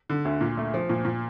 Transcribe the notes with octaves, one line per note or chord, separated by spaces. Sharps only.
D3
D2
A#2
A3
F3
A#2
A#2